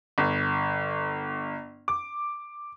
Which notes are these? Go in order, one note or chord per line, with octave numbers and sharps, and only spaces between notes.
G1
D6